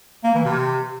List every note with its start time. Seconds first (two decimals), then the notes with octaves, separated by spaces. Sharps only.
0.24 A#3
0.34 E3
0.45 C3